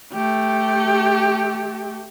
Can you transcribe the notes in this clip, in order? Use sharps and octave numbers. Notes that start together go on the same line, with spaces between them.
A3 G4